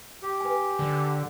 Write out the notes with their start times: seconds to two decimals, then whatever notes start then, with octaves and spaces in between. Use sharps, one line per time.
0.22 G4
0.40 B4 G#5
0.79 D3